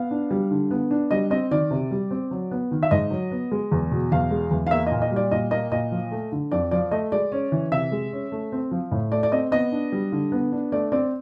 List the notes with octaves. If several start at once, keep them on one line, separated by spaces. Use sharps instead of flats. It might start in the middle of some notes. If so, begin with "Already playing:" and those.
Already playing: B3 F5
D4
G3
D3
B3
D4
G3 D#5
C4 D#5
D#3 D5
C3
G3
C4
F#3
B3
D#3
E5
G#2 D#5
F#3
B3
G#3
E2
B2
E2 F5
G#3
E2
F5
A#3 E5
A#2 D#5
D#5
G3
D5
A#2 D#5
A#3 D#5
A#2 D#5
F3
A3
D3
F2 D5
F3 D5
A3 D#5
G#3 D5
C#4
E3
C3 E5
G#3
C#4
A3
C4
F3
A2
A3 D5
D5
C4 D#5
B3 D#5
D4
G3
D3
B3
D4
A3 D5
C4 D5